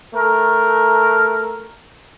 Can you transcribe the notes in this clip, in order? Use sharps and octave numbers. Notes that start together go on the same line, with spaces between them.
A3 A4 A#4